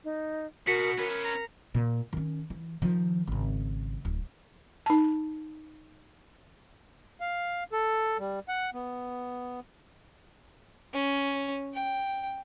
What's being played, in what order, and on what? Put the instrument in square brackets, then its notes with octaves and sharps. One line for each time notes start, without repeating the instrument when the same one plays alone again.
[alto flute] D#4
[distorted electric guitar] B2 [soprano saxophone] F#4 [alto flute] A#4 [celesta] B6 C#7
[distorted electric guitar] C#4 B4 [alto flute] A#4
[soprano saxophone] A#5
[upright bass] A#2
D#3 C#4
E3
D#3 F3
G#1 C#3
D1
[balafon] D#4 A5
[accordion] F5
A4
G3
F#5
B3
[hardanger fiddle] C#4
G5